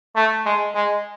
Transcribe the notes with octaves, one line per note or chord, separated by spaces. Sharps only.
A3
G#3
G#3